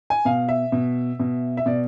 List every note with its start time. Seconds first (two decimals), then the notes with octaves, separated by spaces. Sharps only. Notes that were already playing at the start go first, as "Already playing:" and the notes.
0.10 G#5
0.25 B2 F5
0.49 E5
0.72 B2
1.20 B2
1.57 E5
1.66 B2 D5